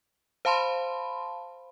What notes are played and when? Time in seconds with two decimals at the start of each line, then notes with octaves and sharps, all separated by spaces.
0.45 C5 F5 A5 B5 C6